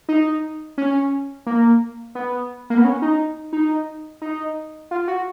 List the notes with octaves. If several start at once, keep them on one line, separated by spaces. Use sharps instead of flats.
D#4
C#4
A#3
B3
A#3
B3
C#4
D#4
D#4
D#4
F4
F#4